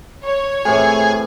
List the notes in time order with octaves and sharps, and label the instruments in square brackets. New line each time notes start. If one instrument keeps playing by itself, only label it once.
[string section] C#5
[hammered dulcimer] A2 C3 E3 [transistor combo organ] G#4